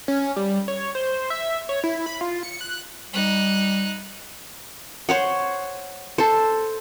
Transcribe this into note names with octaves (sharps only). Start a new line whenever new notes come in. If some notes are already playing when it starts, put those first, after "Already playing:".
C#4
G3
C#5
C5
E5
C#5
E4
B5
F4
C#7
F#6
G3 D#4 F#6
C5 C#5 F#5
A4 C5